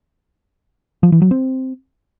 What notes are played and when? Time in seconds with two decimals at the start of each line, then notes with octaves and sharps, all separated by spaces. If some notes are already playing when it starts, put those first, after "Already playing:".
1.03 F3
1.12 E3
1.22 F#3
1.31 C4